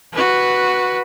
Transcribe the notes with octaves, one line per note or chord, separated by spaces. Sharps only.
F#4 B4